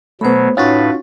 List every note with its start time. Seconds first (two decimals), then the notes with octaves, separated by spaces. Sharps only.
0.21 B2 F#3 A3 B3 C5 B5
0.57 A2 C#4 D#4 F4 F#4 B4 F5 A6